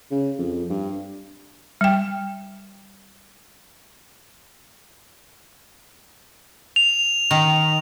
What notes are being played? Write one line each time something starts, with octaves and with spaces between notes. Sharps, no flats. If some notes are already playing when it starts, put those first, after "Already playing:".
C#3
F2
G2
G3 G5
F7
D#3